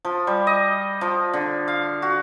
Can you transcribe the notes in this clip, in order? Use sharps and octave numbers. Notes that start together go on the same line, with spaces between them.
F3
G3
D#5
F3
D3
F5
F#4